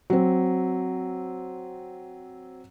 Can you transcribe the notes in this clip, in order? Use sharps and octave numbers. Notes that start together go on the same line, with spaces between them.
F#3 C4